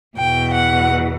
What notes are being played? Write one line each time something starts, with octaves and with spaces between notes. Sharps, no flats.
E2 B2 G5
F#5